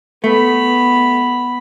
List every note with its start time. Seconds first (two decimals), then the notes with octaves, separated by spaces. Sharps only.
0.24 A3 B3 B5